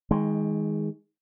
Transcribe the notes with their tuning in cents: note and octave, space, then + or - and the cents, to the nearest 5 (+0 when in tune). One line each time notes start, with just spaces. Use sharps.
D#3 +30 G#3 +0